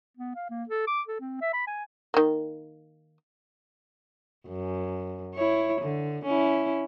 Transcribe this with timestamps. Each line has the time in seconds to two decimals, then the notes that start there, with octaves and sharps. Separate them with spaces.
0.17 B3
0.36 F5
0.50 A#3
0.69 A4
0.87 D6
1.08 A4
1.21 C4
1.41 E5
1.53 B5
1.67 G#5
2.14 D#3 A#3
4.48 F#2
5.34 E4 C#5
5.81 D3
6.25 C#4 E4